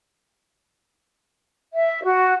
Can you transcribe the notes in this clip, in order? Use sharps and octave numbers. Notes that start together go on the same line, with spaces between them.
E5
F#4